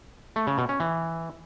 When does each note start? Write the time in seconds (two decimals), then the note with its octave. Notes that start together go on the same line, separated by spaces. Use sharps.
0.36 A3
0.47 C#3
0.58 B2
0.69 C#4
0.80 E3